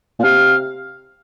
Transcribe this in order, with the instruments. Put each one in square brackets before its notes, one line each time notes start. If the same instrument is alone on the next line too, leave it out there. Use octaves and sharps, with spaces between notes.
[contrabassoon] A#2
[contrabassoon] C3 [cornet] F5